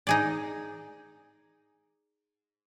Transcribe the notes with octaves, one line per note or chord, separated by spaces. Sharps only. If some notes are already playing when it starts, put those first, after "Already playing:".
D#4 G#4 D5